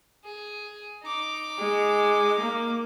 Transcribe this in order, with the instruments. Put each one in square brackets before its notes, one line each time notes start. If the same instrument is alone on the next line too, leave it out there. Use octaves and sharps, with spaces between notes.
[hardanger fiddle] G#4
D#4 D6
[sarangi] G#3
A#3